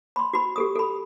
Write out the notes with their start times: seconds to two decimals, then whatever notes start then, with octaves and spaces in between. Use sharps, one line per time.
0.16 B5 C6
0.33 F#4 B5
0.56 G4 A4 D#6
0.75 A4 B5